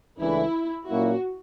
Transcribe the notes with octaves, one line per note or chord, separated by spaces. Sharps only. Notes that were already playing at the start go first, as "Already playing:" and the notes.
C#2 C#3 E3 A3 D4 E4
A#2 F#3 A#3 C#4 E4 F#4